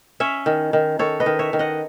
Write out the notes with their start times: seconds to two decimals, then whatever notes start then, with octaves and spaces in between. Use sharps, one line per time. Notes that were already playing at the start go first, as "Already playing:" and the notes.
0.20 C#4 C#5 E5
0.46 D#3
0.73 D#3
0.99 D#3 A4 C#5
1.20 B4 D#5
1.26 D#3
1.39 C#5 E5
1.53 D#3
1.59 D#5 F#5